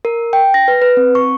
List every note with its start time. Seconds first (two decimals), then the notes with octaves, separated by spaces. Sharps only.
0.05 A#4
0.33 G5
0.54 A#6
0.68 B4
0.82 B4
0.97 C4
1.15 C#6